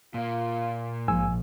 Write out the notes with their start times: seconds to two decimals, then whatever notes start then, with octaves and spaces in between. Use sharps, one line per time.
0.14 A#2 A#3 F4
1.08 A#1 G#2 F3 G#5 E6